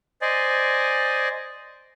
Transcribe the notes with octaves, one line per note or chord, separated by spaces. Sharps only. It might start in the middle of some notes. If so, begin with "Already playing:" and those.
C5 D5 D#5 G#5